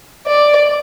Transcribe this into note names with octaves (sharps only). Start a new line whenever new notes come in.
D5